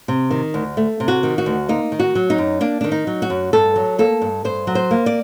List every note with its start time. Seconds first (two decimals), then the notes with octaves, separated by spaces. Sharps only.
0.08 C3
0.30 D#3
0.54 D2
0.77 A3
1.00 C3
1.08 F#4
1.23 D#3
1.38 F#4
1.46 D2
1.69 A#3 D#4
1.92 D#3
1.99 F#4
2.15 F#3
2.30 D#4
2.38 F#2
2.61 A#3 D4
2.81 D#3 D4
2.92 D#4
3.07 F#3
3.22 F#4
3.30 F#2
3.53 G2 A4
3.76 F#3
3.99 A#3 A4
4.22 G2
4.45 G2 C5
4.67 F#3
4.75 C5
4.91 A#3
5.06 D5